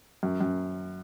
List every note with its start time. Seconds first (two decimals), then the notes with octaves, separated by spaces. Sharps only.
0.23 F#2
0.41 F#2